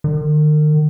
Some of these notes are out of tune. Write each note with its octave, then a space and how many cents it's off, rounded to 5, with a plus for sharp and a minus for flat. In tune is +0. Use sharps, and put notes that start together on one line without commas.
D#3 -40